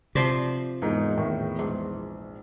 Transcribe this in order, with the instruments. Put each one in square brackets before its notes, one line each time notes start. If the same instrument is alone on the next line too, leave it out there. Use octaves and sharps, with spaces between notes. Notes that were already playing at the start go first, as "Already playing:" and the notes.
[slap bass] C3 [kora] F3 C5 D5
[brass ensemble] E2 [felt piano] G#2 A#3 D#4
[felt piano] A2 D#3
[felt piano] A#1 [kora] G#2